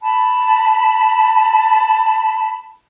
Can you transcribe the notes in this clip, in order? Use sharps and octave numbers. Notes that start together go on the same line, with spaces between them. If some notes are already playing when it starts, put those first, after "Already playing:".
A5 B5